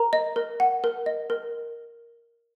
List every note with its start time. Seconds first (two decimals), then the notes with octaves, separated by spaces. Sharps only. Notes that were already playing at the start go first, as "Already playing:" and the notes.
Already playing: A#4 A#5
0.13 D#5
0.36 A#4
0.60 F#5
0.84 A#4
1.06 D#5
1.30 A#4